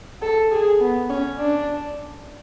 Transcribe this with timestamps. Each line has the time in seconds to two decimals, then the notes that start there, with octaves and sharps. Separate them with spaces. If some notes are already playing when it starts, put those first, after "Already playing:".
0.22 A4
0.51 G#4
0.80 B3
1.09 C#4
1.39 D4